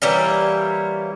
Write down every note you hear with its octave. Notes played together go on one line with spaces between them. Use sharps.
E3 G3 A#3 C#4